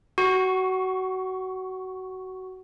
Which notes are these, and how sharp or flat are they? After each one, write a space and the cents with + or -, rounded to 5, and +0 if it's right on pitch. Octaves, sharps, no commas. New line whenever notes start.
F#4 +20 C#6 +0